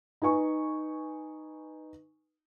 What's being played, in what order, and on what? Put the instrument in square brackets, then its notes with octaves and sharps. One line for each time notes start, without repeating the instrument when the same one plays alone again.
[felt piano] D#4 B4 G#5 C#6